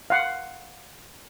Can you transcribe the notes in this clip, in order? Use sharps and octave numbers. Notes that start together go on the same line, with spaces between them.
F5 F#5